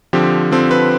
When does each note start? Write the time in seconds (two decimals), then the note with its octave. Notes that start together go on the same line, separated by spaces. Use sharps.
0.13 D3 F3 C4 G4
0.52 D3 F3 C4 A4
0.71 B4